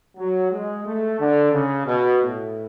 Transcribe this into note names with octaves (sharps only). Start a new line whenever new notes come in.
F#3
G#3
A3
D3
C#3
B2
A2